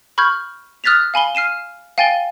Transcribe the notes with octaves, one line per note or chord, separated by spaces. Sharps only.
B5 C#6 F6 G6 G#6
D#6 F6 F#6 A6 B6 F7
F5 G#5 B5 G7
F6 C7 D#7 E7
F5 G5 G#5 A6 D#7 G7